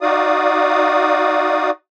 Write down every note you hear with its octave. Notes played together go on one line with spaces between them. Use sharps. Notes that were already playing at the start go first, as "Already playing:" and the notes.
D#4 F#4 D5 F5 D#6